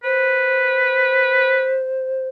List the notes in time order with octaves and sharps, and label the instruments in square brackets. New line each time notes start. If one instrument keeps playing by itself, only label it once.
[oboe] B4 [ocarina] C5